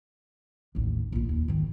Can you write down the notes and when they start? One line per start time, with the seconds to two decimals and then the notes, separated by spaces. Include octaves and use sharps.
0.75 A1 D#2
1.12 A#1 F4
1.29 D#2
1.48 G#2 D#3